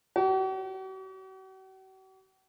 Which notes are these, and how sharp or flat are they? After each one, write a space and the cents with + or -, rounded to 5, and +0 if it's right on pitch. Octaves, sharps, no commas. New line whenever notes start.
F#4 +45